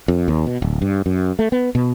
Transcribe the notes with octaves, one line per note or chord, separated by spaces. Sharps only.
F2
D#2
B2
D1
G2
F#2
A3
B3
B2